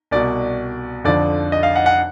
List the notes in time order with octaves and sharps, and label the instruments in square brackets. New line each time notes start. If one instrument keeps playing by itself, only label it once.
[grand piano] C2 B2 D5
F2 D3 F3 D5
D#5
F5
F#5
F#5